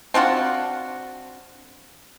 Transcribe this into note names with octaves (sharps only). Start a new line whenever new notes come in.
C4 D4 F4 F#4